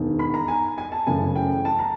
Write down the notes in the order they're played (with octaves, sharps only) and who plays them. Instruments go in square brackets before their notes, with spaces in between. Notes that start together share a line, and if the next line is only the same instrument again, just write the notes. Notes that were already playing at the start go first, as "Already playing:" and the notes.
Already playing: [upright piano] E1 D#2 D#3
B5
A#5
G#5
G#5
A5
F#1 F#2 C#3 E3 A3 G#5
G5
A5
A#5